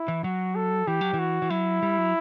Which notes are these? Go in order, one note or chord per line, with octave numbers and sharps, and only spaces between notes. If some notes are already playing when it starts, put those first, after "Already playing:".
Already playing: E4
E3
F#3 F#4
A4
E3 G4
F#3
E3
F#4
E3
F#3 E4
G3
F#3